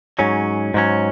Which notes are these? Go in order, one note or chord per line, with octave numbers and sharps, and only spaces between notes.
G#2 F#3 C#4
G#2 F#3 C#4